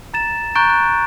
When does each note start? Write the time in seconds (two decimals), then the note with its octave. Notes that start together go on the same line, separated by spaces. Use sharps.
0.14 A#5 A6 E7
0.55 A#5 C#6 F#6 G6 A6 D7
0.69 F#6